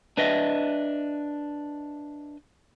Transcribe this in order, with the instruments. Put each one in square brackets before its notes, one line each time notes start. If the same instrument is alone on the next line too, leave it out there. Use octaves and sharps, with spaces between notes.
[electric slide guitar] D4 B4 D#5 E5